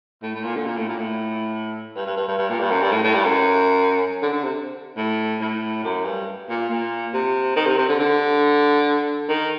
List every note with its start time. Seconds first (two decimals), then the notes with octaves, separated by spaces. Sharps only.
0.23 A2
0.35 A2
0.44 A#2
0.56 D3
0.66 A#2
0.77 A2
0.88 A#2
0.99 A2
1.96 G2
2.06 G2
2.17 G2
2.28 G2
2.39 G2
2.49 A#2
2.60 G2
2.71 F#2
2.82 G2
2.92 A2
3.04 A2
3.14 G2
3.25 F#2
4.22 D3
4.33 D3
4.44 C3
4.97 A2
5.41 A2
5.84 F#2
6.05 G2
6.49 A#2
6.70 A#2
7.13 C3
7.56 D#3
7.67 C3
7.78 C3
7.89 D3
8.00 D3
9.29 D#3